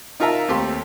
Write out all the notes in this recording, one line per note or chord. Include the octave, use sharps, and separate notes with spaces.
D#4 F4 A#4 E5 A5 A#5
D#2 A3 C4 G4 A4 C6